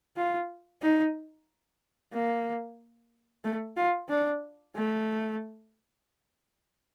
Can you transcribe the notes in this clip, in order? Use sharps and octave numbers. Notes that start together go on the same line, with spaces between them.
F4
D#4
A#3
A3
F4
D4
A3